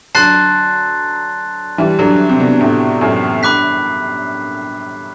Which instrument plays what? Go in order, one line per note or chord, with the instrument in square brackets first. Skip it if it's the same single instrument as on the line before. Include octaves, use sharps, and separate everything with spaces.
[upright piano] D3 F#3 [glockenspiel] A5 C6 F#6 A6 C7
[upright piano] E3 G3
D3 F#3
C3
B2 D3
A2 C3
F#2 A2
[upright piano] G2 [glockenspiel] B5 D6 F#6 B6